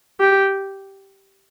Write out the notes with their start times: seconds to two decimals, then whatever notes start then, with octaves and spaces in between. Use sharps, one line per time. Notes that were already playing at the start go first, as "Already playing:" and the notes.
0.20 G4